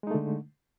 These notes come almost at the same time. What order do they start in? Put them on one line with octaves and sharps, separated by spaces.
G#3 D#4 A3 D3